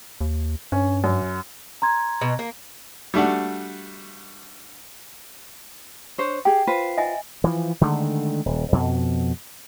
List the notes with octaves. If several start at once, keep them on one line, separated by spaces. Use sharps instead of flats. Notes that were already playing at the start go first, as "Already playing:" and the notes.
D#2
G2 C#4
F#2
A#5 C6 G#6
B2
A#3
G3 A3 D4 F#4
D4 C5 C#5
G4 G#4 G5
F4 B4 C5
D#5 E5 G#5
E3 F3
D3 D#3 G#3 A3
D#1
F2 B2